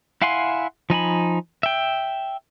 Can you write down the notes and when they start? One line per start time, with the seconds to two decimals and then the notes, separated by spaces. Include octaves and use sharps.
0.22 E4 F5 F#5 G#5 C6
0.90 F3 D#4 G#5 B5
1.63 E5 G5